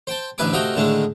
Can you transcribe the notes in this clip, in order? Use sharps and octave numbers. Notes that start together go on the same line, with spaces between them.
C5 G5 A5
A1 D2 B4 E5 G#5 D6
C3 A3 F#4 D#5 F5 G5
A2 D3 D#3 G#3 A3